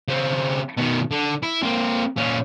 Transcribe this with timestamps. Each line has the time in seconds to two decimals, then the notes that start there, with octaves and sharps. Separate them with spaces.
0.08 C#3 C4
0.77 B2 D#3
1.11 D3
1.43 E4
1.63 A#3 C4
2.17 A#2 C#4